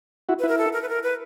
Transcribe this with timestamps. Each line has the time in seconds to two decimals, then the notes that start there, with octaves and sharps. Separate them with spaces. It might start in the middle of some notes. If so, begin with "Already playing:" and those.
0.29 E4 F#4
0.39 B4
0.44 E4 A#4
0.58 A4
0.73 A#4
0.82 B4
0.89 A#4
1.03 B4